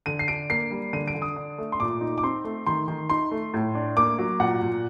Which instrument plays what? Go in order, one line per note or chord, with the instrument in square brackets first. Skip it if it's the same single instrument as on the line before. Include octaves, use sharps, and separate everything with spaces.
[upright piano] D3 D#7
C7
D4 D7
A#3 C7
G3
D3 D#7
D7
D3
D#6
D4
A3
C6
A#2 D6
D#4
D6
C4 C6
A3
D#3 C6
D#3
D#4 C6
A3
A2
D4
A#3 D6
F#3
A#2 F#5
A#2